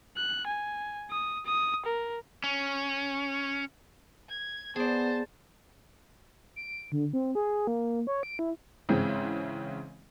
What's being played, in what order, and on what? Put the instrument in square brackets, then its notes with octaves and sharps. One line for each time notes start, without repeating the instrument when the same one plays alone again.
[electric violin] F#6
G#5
D#6
D#6
A#4
[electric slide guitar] C#4
[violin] G#6
[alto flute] B3 [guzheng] G#4 D5 [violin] C5 A5
[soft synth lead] D7
D3
C4
G#4
A#3
C#5
D7
E4
[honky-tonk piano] G#2 C#3 E3 C4